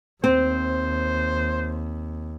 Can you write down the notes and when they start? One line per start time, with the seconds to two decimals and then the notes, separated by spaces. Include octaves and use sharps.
0.24 D#2 C4 C5